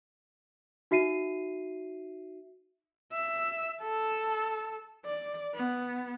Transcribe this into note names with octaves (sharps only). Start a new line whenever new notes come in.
D#4 F#4 E5 C7 D#7
E5
A4
D5
B3